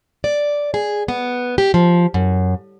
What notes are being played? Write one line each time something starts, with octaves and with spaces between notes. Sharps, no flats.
D5
G#4
B3
G4
F3
F#2